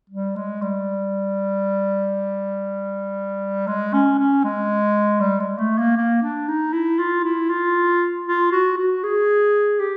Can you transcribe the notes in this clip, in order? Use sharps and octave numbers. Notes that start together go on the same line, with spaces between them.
G3
G#3
G3
G#3
C#4
C#4
G#3
G3
G#3
A3
A#3
A#3
D4
D#4
E4
F4
E4
F4
F4
F#4
F#4
G#4
G4